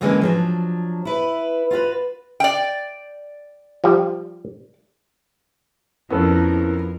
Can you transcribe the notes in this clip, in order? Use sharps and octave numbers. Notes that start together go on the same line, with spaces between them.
F#2 D3 E3 G#3 A#3 C#4
F3 F#3 D4
E4 B4
F4 F#4 A4 B4
D5 G5
F3 G3
F2 B3 C#4 E4 A4 A#4